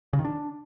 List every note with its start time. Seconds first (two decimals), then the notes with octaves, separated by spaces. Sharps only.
0.13 C#3
0.19 D#3
0.25 D4